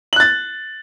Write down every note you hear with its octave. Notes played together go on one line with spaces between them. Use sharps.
F#6 A6 F#7